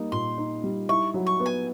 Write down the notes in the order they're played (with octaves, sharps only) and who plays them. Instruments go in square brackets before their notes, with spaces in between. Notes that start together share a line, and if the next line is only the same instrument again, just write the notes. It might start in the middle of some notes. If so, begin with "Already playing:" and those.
Already playing: [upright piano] G3 A#3 D#4
[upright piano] A#2 [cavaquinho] C6
[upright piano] D#4
G3
[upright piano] E4 [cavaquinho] C#6
[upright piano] F#3
[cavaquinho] C#6
[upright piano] B3
[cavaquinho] G#5